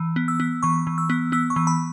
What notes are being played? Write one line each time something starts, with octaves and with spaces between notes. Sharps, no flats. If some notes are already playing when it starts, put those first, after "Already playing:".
Already playing: E3
B3
E6
B3
E3 C#6
E3
E6
B3
B3 E6
C#6
E3
B5